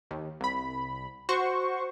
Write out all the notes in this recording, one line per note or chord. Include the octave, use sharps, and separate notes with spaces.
D#2
C2 B5
F#4 C5 C#6